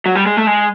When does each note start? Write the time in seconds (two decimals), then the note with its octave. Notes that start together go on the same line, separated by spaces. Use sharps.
0.06 F#3
0.15 G3
0.26 G#3
0.37 A3
0.47 G#3